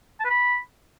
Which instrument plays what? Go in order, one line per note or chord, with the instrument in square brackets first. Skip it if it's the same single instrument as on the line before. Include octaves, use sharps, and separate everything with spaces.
[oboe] A5
B4
B5